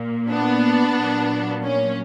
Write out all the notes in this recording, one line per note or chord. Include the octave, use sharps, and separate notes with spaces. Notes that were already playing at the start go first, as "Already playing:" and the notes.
Already playing: A#2 A#3
B3 D4
A#2 F#3 A#3
C#4